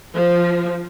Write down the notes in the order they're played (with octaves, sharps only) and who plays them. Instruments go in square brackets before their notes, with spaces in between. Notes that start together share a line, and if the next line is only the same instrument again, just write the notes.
[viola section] F3